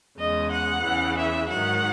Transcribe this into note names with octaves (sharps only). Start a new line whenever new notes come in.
E2 C#3 G#3 D#5
F#5
E2 C#3 E3
E5
G#2 D#3 F#3 F#5